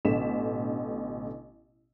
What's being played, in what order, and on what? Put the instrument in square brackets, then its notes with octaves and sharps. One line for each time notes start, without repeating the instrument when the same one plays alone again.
[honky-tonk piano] A1 B2 D3 B6 E7